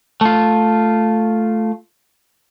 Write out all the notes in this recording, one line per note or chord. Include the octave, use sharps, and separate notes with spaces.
A3 F4